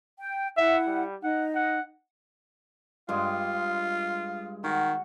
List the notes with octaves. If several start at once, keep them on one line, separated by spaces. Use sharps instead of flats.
G5
E4 E5 F#5
G3
D#4 F#5
F#5
G2 G#3 F4
D#3 F#4